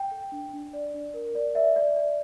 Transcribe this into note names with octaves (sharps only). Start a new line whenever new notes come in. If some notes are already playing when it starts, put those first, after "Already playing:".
Already playing: G5
A4
D4
D4
D5
D4
A#4
D5
D5 E5
D5
D5